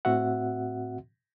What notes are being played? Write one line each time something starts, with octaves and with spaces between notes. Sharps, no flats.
A2 C4 F#4 E5 F#5